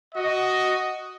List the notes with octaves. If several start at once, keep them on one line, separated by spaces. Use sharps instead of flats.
F#4 D#5